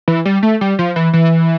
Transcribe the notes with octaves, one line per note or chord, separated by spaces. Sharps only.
E3
G3
A3
G3
F3
E3
E3